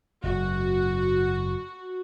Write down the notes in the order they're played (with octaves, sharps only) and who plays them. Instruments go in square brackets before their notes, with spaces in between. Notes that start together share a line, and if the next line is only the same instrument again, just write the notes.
[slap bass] F#1 G#2 [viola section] F#4